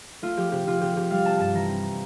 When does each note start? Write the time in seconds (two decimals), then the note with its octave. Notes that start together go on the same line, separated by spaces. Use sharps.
0.22 A3 F4
0.37 F3 G4
0.52 C3 G4
0.67 C3 F4
0.81 C3 G4
0.96 C3 G4
1.11 G3 F5
1.25 C4 A5
1.40 G2 A5
1.54 E3 A#5
1.69 C4